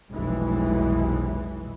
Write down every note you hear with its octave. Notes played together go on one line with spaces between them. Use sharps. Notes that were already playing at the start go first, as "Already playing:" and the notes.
F1 B1 E3 G#3